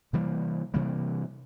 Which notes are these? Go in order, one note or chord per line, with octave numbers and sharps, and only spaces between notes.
C3 E3 G3 A#3
C3 E3 G3 A#3